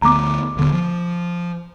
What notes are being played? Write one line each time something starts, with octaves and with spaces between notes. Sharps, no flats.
D2 A3 B3 A#5 D6
D#1 D3 B3
F3